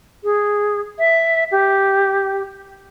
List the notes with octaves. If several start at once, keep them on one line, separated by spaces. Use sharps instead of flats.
G#4
E5
G4